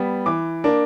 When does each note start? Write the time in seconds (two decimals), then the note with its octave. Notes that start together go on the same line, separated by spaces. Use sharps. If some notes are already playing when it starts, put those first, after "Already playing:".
Already playing: G3 B3
0.26 E3 D6
0.64 A#3 D4